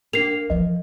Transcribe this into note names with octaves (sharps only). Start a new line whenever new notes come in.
A#3 D4 C7 F7
E3 F3 D#5